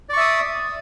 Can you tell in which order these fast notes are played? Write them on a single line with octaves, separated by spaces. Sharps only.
D5 C#6 E5 D#6